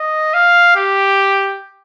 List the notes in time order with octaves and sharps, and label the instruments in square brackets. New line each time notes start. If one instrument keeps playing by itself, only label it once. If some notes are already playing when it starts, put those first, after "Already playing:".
Already playing: [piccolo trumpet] D#5
F5
G4